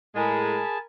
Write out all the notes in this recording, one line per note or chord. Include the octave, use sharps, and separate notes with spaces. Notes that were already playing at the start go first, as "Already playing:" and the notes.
A2 G#3 G#4 A#4 G#5 A5 B5